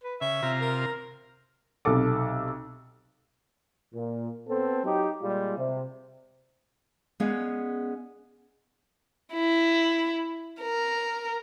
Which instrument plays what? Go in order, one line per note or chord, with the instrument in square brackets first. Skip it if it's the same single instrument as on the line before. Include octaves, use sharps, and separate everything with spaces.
[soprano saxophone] B4
[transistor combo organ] C#3 [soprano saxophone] E5
[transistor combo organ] C3 F4 A#5
[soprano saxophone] A#4
[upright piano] B1 C3 A4 D6
[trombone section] A#2
B3 C4 A4
F#3 D#4 G4
A#2 G3 G#3 F4
C3
[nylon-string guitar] G#3 B3 C#4 G#4 D5 F5
[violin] E4
A#4